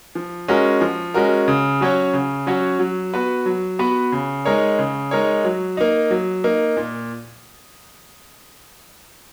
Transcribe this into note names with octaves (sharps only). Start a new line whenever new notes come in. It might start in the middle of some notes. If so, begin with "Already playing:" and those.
F3
G#3 C#4 F#4 A#4
F3
G#3 C#4 F#4 A#4
C#3
F#3 C#4 F#4 C#5
C#3
F#3 C#4 F#4 C#5
F#3
B3 F#4 B4
F#3
B3 F#4 B4
C#3
G#3 D#4 A#4 C#5
C#3
G#3 D#4 A#4 C#5
F#3
A#3 D#4
F#3
A#3 D#4
A#2